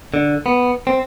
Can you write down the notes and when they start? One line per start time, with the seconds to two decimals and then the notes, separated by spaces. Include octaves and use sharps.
0.14 D3
0.46 B3
0.87 C4